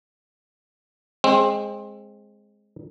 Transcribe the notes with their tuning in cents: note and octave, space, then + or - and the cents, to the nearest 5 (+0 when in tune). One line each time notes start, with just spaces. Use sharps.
G#3 +0 C4 +20